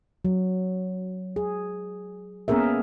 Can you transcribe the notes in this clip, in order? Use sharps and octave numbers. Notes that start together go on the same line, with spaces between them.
F#3
G#4
A#3 B3 C#4 G#4 A#4 E5